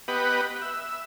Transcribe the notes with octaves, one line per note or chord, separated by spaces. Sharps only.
B3 G4 B4 D#5 F#5
E5